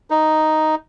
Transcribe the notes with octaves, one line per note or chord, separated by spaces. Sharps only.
D#4